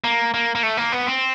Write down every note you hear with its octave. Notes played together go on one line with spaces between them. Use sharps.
A#3
A#3
A#3
A3
A#3
B3
C4